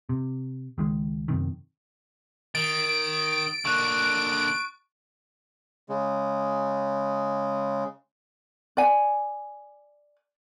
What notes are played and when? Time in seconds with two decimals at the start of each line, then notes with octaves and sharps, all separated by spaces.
0.09 C3
0.78 C#2 D#3 G#3
1.28 F#2 C3 D#3
2.55 D#3 A6 D7
3.65 D3 A#3 C#6 F#6
5.89 C#3 G#3
8.77 D5 G#5